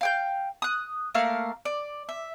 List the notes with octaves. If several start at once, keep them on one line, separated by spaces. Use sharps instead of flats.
F5 G5 G6
D#6 F#6
A3 A#3 A#4 F5
D5
E5